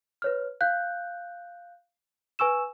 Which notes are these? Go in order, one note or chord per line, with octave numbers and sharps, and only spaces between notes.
B4 C#5 F6
F5 F#6 G6
B4 G#5 C#6 E6 E7